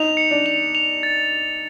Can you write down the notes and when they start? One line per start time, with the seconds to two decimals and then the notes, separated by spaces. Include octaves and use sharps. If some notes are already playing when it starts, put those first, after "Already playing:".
Already playing: D#4 F7
0.17 C#7
0.31 D4
0.46 F7
0.75 F7
1.03 A6